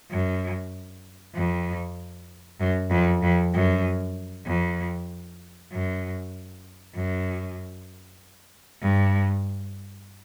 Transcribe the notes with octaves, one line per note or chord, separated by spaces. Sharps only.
F#2
F2
F#2
F2
F2
F#2
F2
F#2
F#2
G2